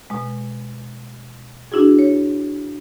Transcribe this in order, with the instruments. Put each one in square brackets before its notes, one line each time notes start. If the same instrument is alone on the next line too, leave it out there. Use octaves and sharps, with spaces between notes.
[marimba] B2 G#3
D4 E4 F#4 G#4
C#5